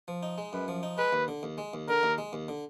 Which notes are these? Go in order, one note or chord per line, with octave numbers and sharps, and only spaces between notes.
F3
D#4
G#3
F#2 B4
F3
D#4
G#3 B4
D#2
D3
D#2
G#3
D#2
D3 A#4
D#2
G#3
D#2
D3